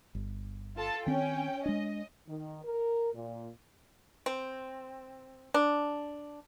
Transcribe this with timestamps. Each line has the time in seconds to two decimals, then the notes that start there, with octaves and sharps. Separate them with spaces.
0.15 G1
0.76 F4 A4 A5
1.06 D#3 C4 C#4 G5
1.66 G#3 D4 D#5
2.27 D#3
2.65 A#4
3.13 A#2
4.26 C4
5.54 D4